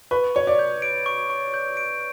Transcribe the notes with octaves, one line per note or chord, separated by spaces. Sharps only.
B4 C#6
C#5 C#6
D5
G6
D7
C#6
C#6
G6
D7